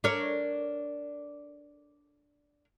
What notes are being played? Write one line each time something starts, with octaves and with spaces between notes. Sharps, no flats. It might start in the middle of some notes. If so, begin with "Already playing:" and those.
D4 A#4 C#5